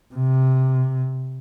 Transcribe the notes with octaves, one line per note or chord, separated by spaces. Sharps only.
C3